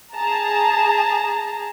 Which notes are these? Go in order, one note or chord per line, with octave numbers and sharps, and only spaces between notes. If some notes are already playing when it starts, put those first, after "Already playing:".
G#4 A5 A#5